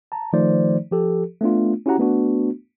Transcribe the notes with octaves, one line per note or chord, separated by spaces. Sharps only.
A5 A#5
D#3 F3 A3 D#4 C5 D5
F3 G4 A4
A3 B3 D4 F4
C#4 E4 F#4 G4 F#5 A#5
A3 B3 D4 F#4